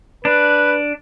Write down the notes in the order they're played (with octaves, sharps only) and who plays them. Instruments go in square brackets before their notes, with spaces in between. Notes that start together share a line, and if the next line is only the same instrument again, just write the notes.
[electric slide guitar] D4 [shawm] B4